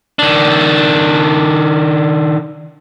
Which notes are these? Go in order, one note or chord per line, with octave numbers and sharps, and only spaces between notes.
D#3 D4